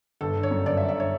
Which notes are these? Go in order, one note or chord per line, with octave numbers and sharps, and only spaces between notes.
G1 A4
D3
C#5
F#2
G1 D5
E5
G1
E5
D3 C#5